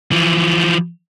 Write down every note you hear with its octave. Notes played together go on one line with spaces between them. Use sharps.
E3 F3